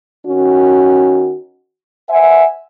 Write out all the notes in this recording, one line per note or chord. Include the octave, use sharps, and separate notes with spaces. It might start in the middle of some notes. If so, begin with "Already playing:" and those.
D#3 C#4 F#4
C5 E5 F#5 G#5